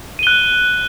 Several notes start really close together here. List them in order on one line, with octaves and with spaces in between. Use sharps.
D#7 G7 F#6